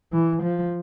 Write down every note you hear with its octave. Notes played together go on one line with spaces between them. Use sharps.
E3
F3